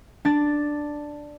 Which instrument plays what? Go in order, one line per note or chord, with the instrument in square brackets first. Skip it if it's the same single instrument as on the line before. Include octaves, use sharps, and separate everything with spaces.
[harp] D4 A6